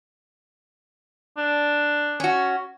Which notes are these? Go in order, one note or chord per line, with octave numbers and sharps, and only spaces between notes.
D4
C#4 F#4